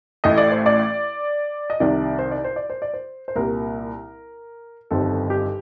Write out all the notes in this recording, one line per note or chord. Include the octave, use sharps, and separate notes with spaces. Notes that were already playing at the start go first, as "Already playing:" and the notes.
A1 A2 A3 D#5
D5
C5
D5
D#5
C2 C3 D#3 D5
C5
D5
C5
D5
C5
D5
C5
C5
C2 A#2 G3 A#4
G1 F2 D#3 G3 C4 A4
G4